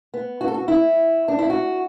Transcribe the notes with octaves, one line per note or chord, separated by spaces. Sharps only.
B3
F#4
A4
F#4
E4
D4
E4
F#4